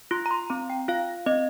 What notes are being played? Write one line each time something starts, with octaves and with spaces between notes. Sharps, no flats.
F4 C6
A#5
C6
C4 A#5
G5
F4 F5
C4 D#5